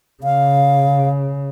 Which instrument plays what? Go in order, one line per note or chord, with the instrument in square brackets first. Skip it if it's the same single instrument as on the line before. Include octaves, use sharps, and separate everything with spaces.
[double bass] C#3 [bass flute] F5